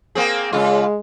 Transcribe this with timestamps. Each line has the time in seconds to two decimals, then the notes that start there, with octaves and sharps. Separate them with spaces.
0.15 A#3 C4 G#4
0.53 C#3 G#3 F4